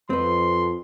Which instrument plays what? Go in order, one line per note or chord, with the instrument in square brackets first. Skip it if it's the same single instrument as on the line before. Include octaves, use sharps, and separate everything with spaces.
[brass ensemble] F2 [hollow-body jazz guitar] C4 B4 [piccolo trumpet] C6